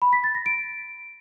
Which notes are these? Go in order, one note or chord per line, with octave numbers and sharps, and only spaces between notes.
B5
B6
A6
A#6
D7